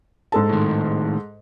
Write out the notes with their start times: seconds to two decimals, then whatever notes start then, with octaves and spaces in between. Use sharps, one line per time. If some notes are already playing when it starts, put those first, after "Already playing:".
0.32 G#2 A4 A5
0.49 A2 D#3